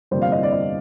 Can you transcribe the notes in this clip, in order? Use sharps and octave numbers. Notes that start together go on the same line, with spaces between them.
G1 F2 C3 G3 A#3 C5
F5
D#5
D5
D#5